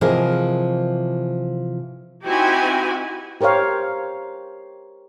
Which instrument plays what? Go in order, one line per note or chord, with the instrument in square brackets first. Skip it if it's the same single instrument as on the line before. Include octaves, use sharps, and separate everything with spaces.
[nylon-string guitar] C3 E3 F3 G#4 A#4 D#5
[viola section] C4 D#4 E4 F#4 G4 G#5
[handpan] G4 A#4 C5 C#5 F5